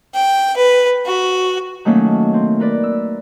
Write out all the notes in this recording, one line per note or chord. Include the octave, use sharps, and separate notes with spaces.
G5
B4
F#4
D#3 F#3 A3 A#3 C#4
C4
A#4 B4 D5
E6